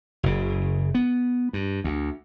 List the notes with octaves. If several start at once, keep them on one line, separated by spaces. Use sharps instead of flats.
F#1 C#3
B3
G2
D2